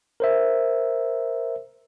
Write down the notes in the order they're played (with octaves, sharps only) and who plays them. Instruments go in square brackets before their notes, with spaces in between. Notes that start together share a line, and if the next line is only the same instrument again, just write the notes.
[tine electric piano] A#4 C5 E5